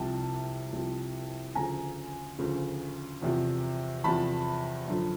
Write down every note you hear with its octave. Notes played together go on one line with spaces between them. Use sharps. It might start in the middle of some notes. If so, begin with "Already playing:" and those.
Already playing: C2 C3 F3 G5 A5
C2 C3 F3
D2 C#3 F3 G#5 A#5
D2 C#3 F3
E2 C3 F3
E2 C3 F3 A5 B5
F#2 D3 F3